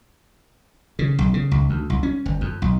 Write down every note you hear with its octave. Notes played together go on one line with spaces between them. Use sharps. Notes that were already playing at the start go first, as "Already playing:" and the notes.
C#3
B1
C#3
C#2
D2
C2
C#4
G1
F2
B1